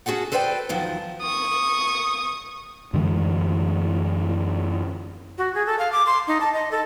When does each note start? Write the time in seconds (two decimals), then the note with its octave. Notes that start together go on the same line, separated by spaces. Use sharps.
0.06 C#4 F#4 G#4 A4 F#5
0.32 A4 B4 C5 D5 F5 G5
0.69 E2 D#3 F3 F#3
1.22 C#6 D#6
2.94 F#2 D3 E3 G#3
5.38 F#4
5.55 G#4
5.66 A4
5.79 F5
5.92 D6
6.07 C6
6.27 D#4
6.41 A5
6.53 D#5
6.71 A4